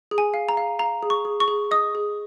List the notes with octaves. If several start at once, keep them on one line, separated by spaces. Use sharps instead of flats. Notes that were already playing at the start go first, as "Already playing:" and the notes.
G#4
G#5
F5
A#5
F5
F5 A#5
G#4
C#6
G#4
C#6
G#4
D#5 D#6
G#4